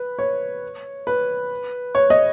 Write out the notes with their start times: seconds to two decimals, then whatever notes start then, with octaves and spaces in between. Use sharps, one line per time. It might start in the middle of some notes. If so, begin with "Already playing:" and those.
Already playing: B4
0.19 C#5
1.07 B4
1.95 C#5
2.10 D#5